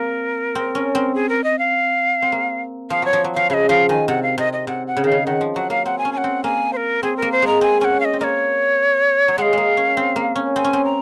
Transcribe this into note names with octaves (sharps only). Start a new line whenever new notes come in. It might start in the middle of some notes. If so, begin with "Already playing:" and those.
Already playing: A#3 C4 A#4
C4
C#4
C4
G#4
A#4
D#5
F5
C4
A#3
F3 F5
F#3 C#5
F3
F#3
F3 F5
C#3 D#5 F5
F3 F5
D#3 G#5
C3 F#5
F5
C3 D#5
D#5
C3 F#5
F#5
C#3
D#3 F5
C#3
D#3 F#5
F3
F#3 F#5
A#3 F5
C4 F#5
G#5
C#4
G#5
F#5
C4
A#3 G#5
C5
A#4
C4 G#4
A#4
A#3
C5
G#3 A#5
C4 G#5
C#4 F#5 G#5
F5
D#5
C4
A#3 C#5 D#5
F#3
G#3 F5 F#5
G#3 A#3
C#4
C4
A#3
C#4
C4 G#5
C#4
C4
A#5